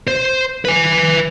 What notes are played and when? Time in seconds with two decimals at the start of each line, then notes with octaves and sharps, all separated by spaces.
0.08 C5
0.65 B4 G#5